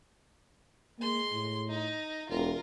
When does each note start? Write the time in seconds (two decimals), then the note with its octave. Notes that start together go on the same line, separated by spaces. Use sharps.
0.99 G#3 A#3 C6
1.32 A2
1.67 D#4
2.29 E1 F4 A#4